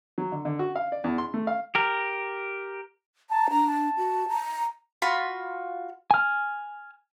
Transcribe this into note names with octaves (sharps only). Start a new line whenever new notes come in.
F#3
D3
D3
F#4
F5
D5
E2
C6
A3
F5
G4 A#4
A5 A#5
D4 A#5
A5
F#4
A#5
F4 F#4 B5 C6
G#5 F6